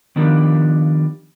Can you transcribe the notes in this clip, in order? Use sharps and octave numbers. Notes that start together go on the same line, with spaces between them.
D#3 F3 B3 D4 G4 A#4